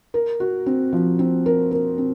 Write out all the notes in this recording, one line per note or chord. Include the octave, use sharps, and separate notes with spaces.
A#4
F#4
C4
F3
C4
A#4
A#4
C4